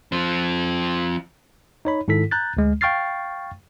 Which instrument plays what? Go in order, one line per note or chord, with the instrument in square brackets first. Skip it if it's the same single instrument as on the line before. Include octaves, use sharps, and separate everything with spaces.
[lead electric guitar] F3 C4
[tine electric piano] D#4 C#5 B5
G#2 D#3 E4 A4 B6
A#5 F#6 G6 A6
D2 G#3
F5 G5 C#6 F6 A6 C7